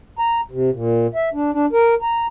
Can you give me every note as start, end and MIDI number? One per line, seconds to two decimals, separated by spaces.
0.19 0.41 82
0.51 0.70 48
0.73 1.07 46
1.15 1.29 76
1.34 1.51 62
1.52 1.66 62
1.73 1.95 70
2.02 2.27 82